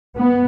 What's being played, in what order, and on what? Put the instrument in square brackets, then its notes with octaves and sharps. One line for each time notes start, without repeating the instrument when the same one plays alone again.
[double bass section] B3